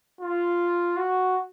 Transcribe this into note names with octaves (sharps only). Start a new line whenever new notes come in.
F4
F#4